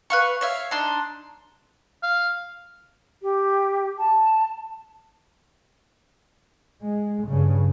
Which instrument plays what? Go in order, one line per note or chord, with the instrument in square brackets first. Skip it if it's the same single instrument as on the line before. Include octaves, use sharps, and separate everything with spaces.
[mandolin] B4 F5 C#6
C#5 E5 F5
D4 D#4 C6
[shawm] F5
[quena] G4
A5
[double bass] G#3
G2 C#3